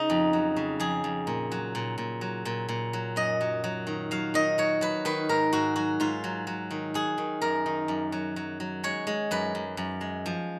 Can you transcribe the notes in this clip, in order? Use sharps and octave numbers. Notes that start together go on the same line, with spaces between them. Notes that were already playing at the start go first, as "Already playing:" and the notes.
Already playing: C#3 D#4
F2
F#3
C#3
F2 G#4
F2
A#2
F#3
A#2
A#2
F#3
A#2
A#2
F#3
F#2 D#5
F#3
F#3
D#3
F#3 F5
D#3 D#5
F#3 C#5
F#3 B4
D#3 B4
G#2 A#4
G#2 F#4
F#3 F#4
G#2 F4
F#3
F#3
D#3
F#3 G#4
D#3
F#2 A#4
D#3
F#2
F#3
F#3
F#3
G#3 C#5
G#3
F#2 B4
F#2
F#2
G#3
F3